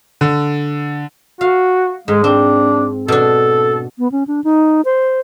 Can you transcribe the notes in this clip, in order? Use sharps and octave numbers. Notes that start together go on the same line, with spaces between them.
D3
F#4 F5
G#2 G#3
C4 D4
B2 D4 A4
B3
C#4
D4
D#4
C5